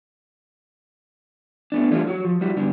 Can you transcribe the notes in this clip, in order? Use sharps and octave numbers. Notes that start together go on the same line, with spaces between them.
A3 B3 D4
E3 G3 A3 D4 F4
F#3 F#4
F3
G3 E4 F#4
G2 D3 G3 D4